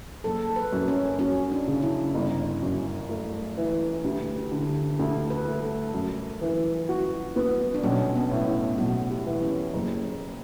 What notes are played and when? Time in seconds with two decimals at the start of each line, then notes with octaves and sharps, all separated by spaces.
0.24 F#1 A4
0.56 B4
0.72 F#2
0.88 C#4
1.19 F#3 C#4
1.52 D4
1.67 C#3
1.83 E4
2.15 G1
2.62 F#2
3.09 A3
3.57 E3
4.04 D2 G4
4.36 B4
4.51 D3
4.67 G4
4.98 D2 A4
5.30 B4
5.46 A3
5.63 A4
5.94 F#2
6.41 E3
6.89 F#4
7.36 B3
7.74 D4
7.83 B1 C#4
8.16 B3
8.31 A2
8.47 E4
8.78 B1 F#4
9.10 G4
9.26 E3
9.42 C#4
9.73 F#1